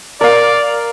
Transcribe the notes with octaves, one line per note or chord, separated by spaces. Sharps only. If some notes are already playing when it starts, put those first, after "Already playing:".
A#4 D5 F5